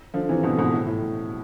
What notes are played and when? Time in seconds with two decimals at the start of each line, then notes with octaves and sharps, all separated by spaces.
0.14 D3 F3
0.29 C3 E3
0.43 B2 D3
0.57 G#2 B2
0.72 A2
0.87 A2